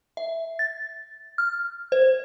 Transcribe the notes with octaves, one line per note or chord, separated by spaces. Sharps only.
E5
A6
F6
C5